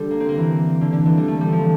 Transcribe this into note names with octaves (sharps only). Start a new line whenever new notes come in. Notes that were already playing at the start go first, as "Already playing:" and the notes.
Already playing: D3 G3 D4
A#3
C4
A#3
E3
D3
D3
E3
G3
A3
G3
F3